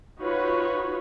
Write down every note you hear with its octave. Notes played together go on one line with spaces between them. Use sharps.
D#4 F4 F#4 B4 C#5